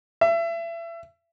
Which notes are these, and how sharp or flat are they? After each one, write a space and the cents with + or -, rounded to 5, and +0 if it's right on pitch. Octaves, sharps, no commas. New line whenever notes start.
E5 +30